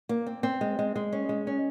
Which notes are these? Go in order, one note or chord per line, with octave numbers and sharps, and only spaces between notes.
A#3
C4
C4
G#3
G#3
G#3
C#4
G#3
C#4